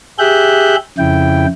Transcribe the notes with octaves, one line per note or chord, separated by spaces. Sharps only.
G4 G#4 E5 F#6 G6
F2 C#3 E4 G5